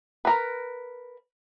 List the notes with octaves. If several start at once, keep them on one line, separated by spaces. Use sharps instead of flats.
A#4 B4